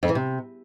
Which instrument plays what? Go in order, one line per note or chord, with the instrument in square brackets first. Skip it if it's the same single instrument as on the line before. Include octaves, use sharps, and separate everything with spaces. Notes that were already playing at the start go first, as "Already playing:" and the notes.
[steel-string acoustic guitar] F2
E3
C3